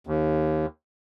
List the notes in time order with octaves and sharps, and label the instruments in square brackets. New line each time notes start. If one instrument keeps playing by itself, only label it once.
[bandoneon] D#2